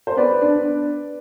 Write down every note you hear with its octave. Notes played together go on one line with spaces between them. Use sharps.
C5
B3 B4 D5
D4